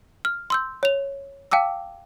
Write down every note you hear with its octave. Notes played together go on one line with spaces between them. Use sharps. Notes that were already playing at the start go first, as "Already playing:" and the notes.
F6
C6 E6 G6
C#5 F7
F5 G5 A5 D6 E6